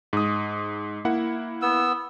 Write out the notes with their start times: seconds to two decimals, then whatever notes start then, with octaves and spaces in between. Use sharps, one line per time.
0.13 G#2 D#6
1.05 A#3 E4 F#5
1.62 B3 E6